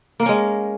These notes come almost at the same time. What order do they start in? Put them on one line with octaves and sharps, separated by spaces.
A#3 A#4 C#4 G#3